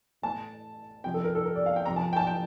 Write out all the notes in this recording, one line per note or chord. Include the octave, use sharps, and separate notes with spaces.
A2 E3 A5
C3 F3 G5
A4
A#4
A4
A#4
D5
F5
G5
C3 F3 A#5
A5
G5
A5
G5